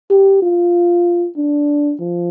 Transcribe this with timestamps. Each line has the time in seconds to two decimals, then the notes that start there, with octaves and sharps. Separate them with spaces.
0.10 G4
0.42 F4
1.37 D4
2.00 F3